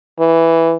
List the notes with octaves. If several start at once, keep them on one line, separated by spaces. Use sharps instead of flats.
E3